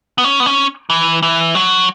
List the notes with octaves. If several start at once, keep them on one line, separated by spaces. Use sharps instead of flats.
B3
C#4
B3
C#4
E3
E3
F#3